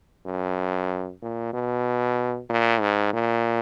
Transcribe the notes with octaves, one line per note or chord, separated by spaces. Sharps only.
F#2
A#2
B2
A#2
G#2
A#2